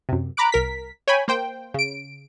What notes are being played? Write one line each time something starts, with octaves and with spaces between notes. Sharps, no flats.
F#2 C3
A#5 B5 D6 F#6 D7
C2 A#4 B6
C#5 G5 G#5 B5
A#3 C5 G5
C#3 D7